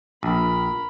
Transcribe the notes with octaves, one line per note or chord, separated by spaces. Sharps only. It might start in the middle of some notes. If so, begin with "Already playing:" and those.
A#1 A#4 B5